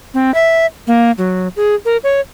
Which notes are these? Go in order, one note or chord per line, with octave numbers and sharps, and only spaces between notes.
C4
E5
A#3
F#3
G#4
A#4
C#5